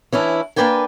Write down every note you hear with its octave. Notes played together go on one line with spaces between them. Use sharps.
E3 C#4 D4 E4
A#3 D4 B4 D5 G5 G#5